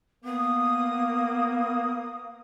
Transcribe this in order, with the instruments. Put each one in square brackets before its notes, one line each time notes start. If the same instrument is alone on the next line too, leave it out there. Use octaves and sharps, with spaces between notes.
[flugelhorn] A#3 [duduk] B3 [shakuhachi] D#6